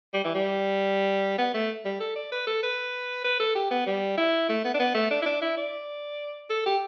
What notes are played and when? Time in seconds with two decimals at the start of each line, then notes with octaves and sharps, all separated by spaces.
0.14 G3
0.25 E3
0.35 G3
1.38 B3
1.54 A3
1.85 G3
2.00 A4
2.16 D5
2.32 B4
2.47 A4
2.63 B4
3.24 B4
3.40 A4
3.56 G4
3.71 B3
3.87 G3
4.18 E4
4.49 A3
4.64 B3
4.74 D4
4.80 B3
4.95 A3
5.11 D4
5.22 E4
5.26 D4
5.42 E4
5.57 D5
6.50 A4
6.66 G4